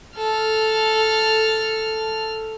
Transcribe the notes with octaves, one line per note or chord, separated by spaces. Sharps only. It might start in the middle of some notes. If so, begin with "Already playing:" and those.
A4 F6